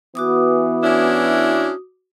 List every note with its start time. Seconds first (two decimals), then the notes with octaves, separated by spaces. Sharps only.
0.15 E3 B3 F#4 D6 D#6
0.83 C#4 D4 E4